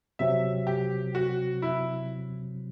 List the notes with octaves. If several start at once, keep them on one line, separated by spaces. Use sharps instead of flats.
C3 F#3 C4 E5
G4
F#4
E4